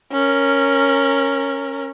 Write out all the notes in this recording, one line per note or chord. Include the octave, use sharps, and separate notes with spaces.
C#4 A#4